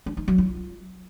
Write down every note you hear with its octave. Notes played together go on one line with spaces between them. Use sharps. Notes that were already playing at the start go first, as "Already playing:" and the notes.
D4
D#4
F#3
F4